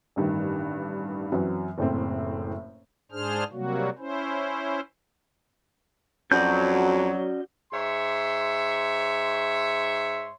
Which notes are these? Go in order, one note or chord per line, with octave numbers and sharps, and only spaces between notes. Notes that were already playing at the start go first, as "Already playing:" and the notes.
A1 G2 D#3
F#2 E3 F#3 C4
F#1 A2 C4
G#2 D4 G#4 C5 F6
C3 F#3 G3 A#3 F#4
C#4 E4 C5
F2 F#3 C#4 F#4 D5 G6
G#2 C#5 E5 C6